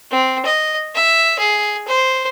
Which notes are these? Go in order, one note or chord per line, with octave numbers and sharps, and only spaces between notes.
C4
D#5
E5
G#4
C5